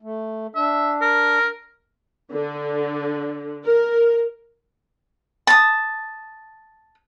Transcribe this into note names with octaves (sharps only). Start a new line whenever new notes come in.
A3
D4 E5
A#4
D3
A#4
A5 D#6